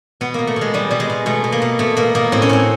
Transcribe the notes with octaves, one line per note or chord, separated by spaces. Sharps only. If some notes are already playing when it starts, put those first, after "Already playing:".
B2 B3
B2 A#3
A3
B2
G#3
B2 G3
B2 G3
G#3
B2
B2 A3
B2
A#3
B2
B2 A3
B2 A#3
B2 A#3
A2 C4
C#4
A2 C4